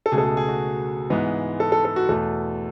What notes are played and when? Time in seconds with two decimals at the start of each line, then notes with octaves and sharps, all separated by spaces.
0.06 A4
0.12 C#2 B2 A3 G#4
0.18 A4
0.24 G#4
0.37 G#4
0.49 F#4
1.10 G#2 E3 G#3 B3
1.60 A4
1.72 A4
1.85 A4
1.96 F#4
2.09 E2 B2 A3 A4